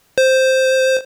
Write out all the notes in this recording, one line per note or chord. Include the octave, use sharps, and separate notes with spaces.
C5